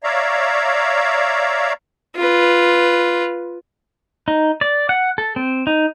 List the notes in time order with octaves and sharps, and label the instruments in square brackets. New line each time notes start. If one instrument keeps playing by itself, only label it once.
[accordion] C#5 D5 E5 F5 A#5
[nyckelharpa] F4 B4
[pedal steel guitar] D#4
D5
F#5
A4
C4
D#4